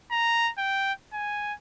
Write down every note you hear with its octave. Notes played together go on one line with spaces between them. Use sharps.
A#5
G5
G#5